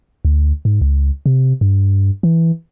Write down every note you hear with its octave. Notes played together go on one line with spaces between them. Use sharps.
D2
G#2
C#2
C3
G2
E3